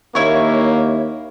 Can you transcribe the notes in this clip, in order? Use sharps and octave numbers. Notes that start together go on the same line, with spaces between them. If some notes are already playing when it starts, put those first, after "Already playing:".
D#2 A#3 E4 C#5